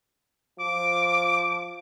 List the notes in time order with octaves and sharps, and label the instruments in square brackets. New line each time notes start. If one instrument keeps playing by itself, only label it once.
[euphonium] F3 [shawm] D6